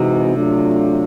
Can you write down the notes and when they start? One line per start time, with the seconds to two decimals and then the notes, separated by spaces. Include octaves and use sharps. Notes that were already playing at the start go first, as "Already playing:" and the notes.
Already playing: C3 E3 G#3 C4 D#4 F#4
0.34 F#3 A3 D4 F4